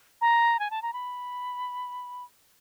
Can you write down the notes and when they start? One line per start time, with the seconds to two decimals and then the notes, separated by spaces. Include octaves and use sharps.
0.21 A#5
0.59 G#5
0.71 A5
0.82 A#5
0.93 B5